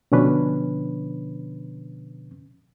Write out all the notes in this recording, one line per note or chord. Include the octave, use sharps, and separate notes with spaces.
B2 D3 F3 C#4 D4 B4